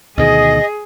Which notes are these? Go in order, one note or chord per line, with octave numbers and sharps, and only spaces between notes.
D2 B2 D#3 G#4 D#5